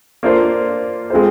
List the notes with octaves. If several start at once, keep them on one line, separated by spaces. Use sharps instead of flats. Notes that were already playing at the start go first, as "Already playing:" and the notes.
A#3 D4 F4 C5
G#3 C4 F4 C5